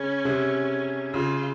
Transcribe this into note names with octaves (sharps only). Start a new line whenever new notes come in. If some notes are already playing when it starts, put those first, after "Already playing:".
Already playing: C#3 C#4
C3
C#3 F4